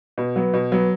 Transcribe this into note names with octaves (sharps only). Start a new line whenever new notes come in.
B2
F#3 B3
B2
F#3 B3